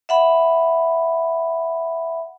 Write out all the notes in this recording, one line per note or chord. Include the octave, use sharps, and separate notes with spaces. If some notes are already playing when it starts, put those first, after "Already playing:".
E5 F#5 B5